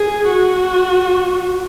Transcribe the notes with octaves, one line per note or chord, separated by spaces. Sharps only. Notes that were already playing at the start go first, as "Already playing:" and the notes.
Already playing: G#4
F#4